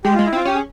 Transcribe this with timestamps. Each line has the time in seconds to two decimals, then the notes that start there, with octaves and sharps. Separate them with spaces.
0.04 G#3 G4
0.15 G#3 F4
0.26 E4
0.33 C4 F4
0.45 C#4 G4
0.55 G#4